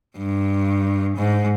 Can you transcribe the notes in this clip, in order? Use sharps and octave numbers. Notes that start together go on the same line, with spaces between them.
G2
G#2